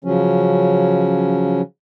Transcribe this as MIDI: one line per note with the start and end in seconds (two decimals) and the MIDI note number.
0.04 1.62 49
0.04 1.62 53
0.04 1.62 54
0.04 1.62 61